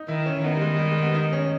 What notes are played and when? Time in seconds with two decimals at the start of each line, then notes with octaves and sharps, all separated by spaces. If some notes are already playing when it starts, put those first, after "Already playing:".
Already playing: D#4
0.08 D#3 E4
0.26 C#4
0.43 D#3 B3
0.55 G3
0.61 G#3
0.79 G3
0.91 G#3
1.03 B3
1.15 D#4
1.33 C#4